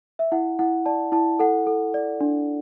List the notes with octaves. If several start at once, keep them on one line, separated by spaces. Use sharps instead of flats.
E5
E4 F#5
E4 F#5
D5 A5
E4 A5
A4 F#5
A4
D5
D4